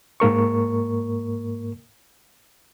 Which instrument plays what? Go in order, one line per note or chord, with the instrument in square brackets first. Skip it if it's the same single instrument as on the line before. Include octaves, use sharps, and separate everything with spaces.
[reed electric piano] G#2 A#3 A#4 C#6